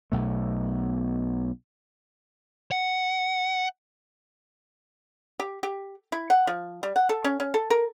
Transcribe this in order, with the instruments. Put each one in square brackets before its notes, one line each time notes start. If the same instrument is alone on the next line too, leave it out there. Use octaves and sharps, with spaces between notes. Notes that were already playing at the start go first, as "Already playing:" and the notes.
[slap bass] B1 B2 A3
[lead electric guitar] F#5
[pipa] G4
G4
E4
F#5
F3
G3
F#5
A4
C#4
C#4
A4
A#4